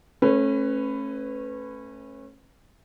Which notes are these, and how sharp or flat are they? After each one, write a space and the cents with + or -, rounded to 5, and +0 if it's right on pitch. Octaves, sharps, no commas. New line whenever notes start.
A3 +0 C#4 -25 B4 +15